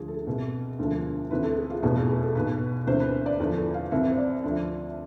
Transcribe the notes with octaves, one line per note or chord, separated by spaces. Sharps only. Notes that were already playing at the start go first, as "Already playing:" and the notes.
Already playing: D2 D3 F3 G#4
A4
G#4
C2 B2
E1 D2 D3 F3
D2 C3 E3 B4
A4
G#4
F4
F1 E2 B2 G#4
F4
G#4
A4
B1 B2 B4
E1 D2 C3 E3 C5
B4
D5
E2 D3 F3 A4
A4
F5
C2 C3 E3 E5
C5
D5
D2 D3 F3